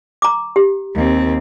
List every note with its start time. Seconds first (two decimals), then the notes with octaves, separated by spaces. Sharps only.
0.22 A#5 D6
0.56 G4
0.95 D#2 C4